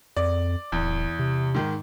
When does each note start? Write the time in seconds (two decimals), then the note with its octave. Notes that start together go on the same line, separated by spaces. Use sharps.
0.17 F2 D5
0.72 D1 E2
1.19 C3
1.54 G#2 D#3